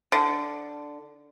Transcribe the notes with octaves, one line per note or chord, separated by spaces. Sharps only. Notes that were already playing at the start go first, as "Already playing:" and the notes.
D3